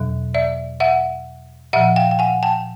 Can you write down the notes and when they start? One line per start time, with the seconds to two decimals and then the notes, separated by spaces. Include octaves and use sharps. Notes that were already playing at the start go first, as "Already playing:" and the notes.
Already playing: E2 B2 F#3
0.34 D5 E5
0.80 E5 F#5
1.73 A#2 F3 E5 F#5
1.96 F5 G5
2.11 G5
2.19 F#5 G#5
2.43 G5 A5